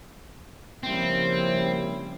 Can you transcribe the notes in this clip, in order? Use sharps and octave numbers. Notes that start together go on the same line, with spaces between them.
C#3 F3 G3 A#3 C4 C#4 E4